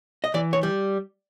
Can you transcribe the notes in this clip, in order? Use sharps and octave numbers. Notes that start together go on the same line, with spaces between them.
D#5
E3 D5
C#5
G3